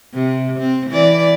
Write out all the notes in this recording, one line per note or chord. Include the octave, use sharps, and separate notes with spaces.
C3
C4
E3 D5